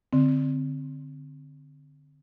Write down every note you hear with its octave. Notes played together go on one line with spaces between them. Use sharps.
D3 C4